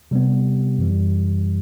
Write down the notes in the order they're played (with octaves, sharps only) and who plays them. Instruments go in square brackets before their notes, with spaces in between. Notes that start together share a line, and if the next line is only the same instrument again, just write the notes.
[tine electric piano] C3 G3 B3
F#2 E3 G3